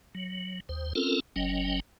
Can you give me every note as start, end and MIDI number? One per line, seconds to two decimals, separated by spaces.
0.15 0.60 54
0.69 0.93 39
0.69 0.93 72
0.95 1.20 60
0.95 1.20 61
0.95 1.20 65
0.95 1.20 69
0.95 1.20 70
1.36 1.80 30
1.36 1.80 54
1.36 1.80 61
1.36 1.80 75
1.36 1.80 79